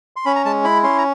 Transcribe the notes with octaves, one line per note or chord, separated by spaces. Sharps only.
C6
C#4 B5
A#5
G#3 A5
E4 B5
C#4 C6
A#5